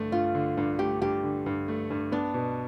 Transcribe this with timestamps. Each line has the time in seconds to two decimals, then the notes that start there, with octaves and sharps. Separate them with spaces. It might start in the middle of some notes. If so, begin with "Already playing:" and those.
Already playing: G2 D3 A3
0.12 G2 F4
0.35 D3
0.57 G2
0.79 A3 G4
1.02 G2 G4
1.24 D3
1.46 G2
1.68 A3
1.90 G2
2.12 B3 D4
2.34 B2